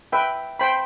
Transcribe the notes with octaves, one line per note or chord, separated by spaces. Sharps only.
B4 E5 G5
C5 G5 B5